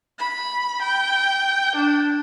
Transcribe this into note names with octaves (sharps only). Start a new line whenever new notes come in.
B5
G5
D4